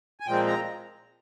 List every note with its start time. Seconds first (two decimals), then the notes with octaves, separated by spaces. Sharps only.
0.20 G#5
0.27 A#2 F3 G#3 C4 G5
0.46 A#5